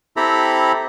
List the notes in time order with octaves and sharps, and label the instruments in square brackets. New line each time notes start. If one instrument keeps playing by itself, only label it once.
[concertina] C4 E4 G4 A4 A#5 B5